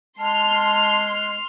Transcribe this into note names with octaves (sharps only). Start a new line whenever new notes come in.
G#3 A5 C6 F6